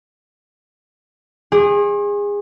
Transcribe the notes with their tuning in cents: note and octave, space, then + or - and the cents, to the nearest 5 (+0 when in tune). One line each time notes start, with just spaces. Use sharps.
G#4 -25 D5 +0 C6 +45